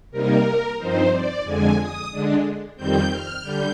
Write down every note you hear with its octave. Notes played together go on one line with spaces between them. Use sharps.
C3 G3 A#3 D#4 A#4
G2 F3 C4 D#4 C5
D5
F2 D3 G#3 G#5
D#6
D3 G#3 D4
F2 D#3 G3 C4 G6
F6
D3 G3 G6